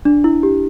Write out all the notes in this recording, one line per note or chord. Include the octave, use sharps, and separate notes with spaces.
D4
E4
G4